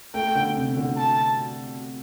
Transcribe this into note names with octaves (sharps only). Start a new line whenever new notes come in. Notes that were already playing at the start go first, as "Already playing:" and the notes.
A3 G5
D3
C3
D3
A5